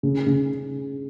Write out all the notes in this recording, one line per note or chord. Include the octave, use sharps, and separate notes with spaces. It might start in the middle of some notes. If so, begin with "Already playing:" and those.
C#3
C#3